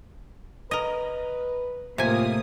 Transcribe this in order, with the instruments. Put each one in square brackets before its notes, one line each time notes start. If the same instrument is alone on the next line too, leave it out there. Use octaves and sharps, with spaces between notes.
[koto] A#4 D#5 [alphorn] B4
[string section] A2 A#3 D#6 [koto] C3 G#5 [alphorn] F4